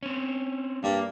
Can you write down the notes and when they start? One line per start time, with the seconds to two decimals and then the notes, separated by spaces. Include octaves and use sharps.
0.03 C4 C#4
0.84 G2 A#3